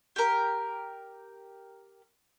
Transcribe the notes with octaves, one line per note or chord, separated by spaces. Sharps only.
G4 A#4